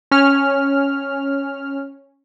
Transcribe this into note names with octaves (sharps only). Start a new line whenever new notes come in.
C#4 F6